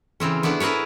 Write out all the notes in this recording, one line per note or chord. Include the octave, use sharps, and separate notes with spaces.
C#3 E3 C4 C#4
A3 B3 D4 E4 D5
E4 G#4 A#4 B4 C#5